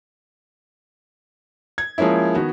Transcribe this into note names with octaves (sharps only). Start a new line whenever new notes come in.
G#6
F3 G#3 A#3 C#4 E4
D#3 B3 F#4